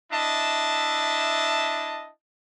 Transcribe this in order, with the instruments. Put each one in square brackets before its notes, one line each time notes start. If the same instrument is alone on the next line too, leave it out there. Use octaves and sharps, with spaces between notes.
[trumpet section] D4 E4 D#5 E5 A5